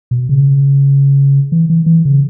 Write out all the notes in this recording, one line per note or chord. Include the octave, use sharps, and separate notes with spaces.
B2
C#3
E3
E3
E3
C#3